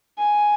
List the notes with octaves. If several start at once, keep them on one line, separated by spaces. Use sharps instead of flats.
G#5